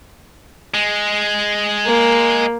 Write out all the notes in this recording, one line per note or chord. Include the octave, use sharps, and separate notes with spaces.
G#3
A#3